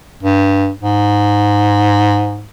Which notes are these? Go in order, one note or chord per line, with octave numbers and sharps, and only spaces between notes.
G2
G#2